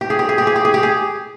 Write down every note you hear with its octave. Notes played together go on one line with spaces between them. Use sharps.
G4
G#4
G4
G#4
G4
G#4
G4
G#4
G4
G#4